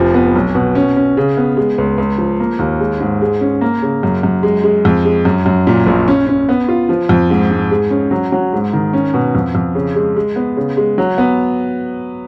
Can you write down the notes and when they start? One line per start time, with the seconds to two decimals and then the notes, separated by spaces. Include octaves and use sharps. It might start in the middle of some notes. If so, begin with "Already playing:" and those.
Already playing: F1 F3
0.14 B3
0.35 B1
0.55 B2
0.75 C#4
0.96 C#4
1.17 C#3
1.37 B3
1.57 G#3
1.78 C#2
1.98 C#2
2.18 F3
2.40 A#3
2.59 D#2
2.80 G#3
3.00 G#2
3.22 G#3
3.41 C#4
3.61 A#3
3.82 C#3
4.03 F#2
4.23 F#2
4.43 G#3
4.64 G#3
4.85 F2
5.05 G#3
5.25 F#2
5.46 F#2
5.67 A#2
5.87 A#1
6.08 C#4
6.27 C#4
6.49 B3
6.68 F4
6.89 F3
7.09 F2
7.30 G#2
7.51 G#2
7.71 G#3
7.90 C#4
8.11 F#3
8.32 F#3
8.53 G#2
8.73 D#3
8.93 C#4
9.14 B2
9.35 F2
9.55 F2
9.75 C#3
9.96 G#3
10.16 G#3
10.36 B3
10.57 C#3
10.77 G#3
10.98 F#3
11.18 B3